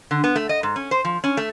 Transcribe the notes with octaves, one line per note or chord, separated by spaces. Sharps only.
D3
B3
A3
D#5
G#2
C#4
C5
F3
C#4
A3